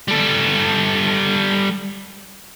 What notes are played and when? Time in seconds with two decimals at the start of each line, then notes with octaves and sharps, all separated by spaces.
0.08 G3 A4